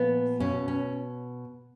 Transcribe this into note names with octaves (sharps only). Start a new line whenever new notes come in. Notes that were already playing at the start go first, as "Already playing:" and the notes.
Already playing: A#2 F3 B3
B2 C#4
C#4